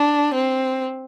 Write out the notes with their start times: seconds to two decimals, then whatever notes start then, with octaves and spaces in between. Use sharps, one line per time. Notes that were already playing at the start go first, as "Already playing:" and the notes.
Already playing: D4
0.34 C4